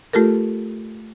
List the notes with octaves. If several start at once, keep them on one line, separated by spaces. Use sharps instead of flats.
A3 F4 G4 A4 A#4